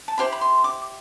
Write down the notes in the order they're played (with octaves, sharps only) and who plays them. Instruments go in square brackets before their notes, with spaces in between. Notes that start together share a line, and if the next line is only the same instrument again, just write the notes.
[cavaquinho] A5
E4 G4 C5 B5
B5
C6
D6